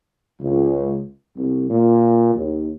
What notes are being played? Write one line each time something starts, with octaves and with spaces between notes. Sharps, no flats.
C#2
C2
A#2
D#2